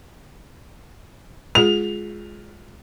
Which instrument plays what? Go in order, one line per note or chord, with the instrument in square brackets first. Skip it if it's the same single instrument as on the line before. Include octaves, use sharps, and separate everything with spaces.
[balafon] G#3 F4 G#4 [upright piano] F7